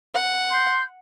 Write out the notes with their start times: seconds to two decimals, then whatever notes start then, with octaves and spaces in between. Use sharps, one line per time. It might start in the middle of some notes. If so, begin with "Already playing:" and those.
0.15 F#5
0.51 C6 G6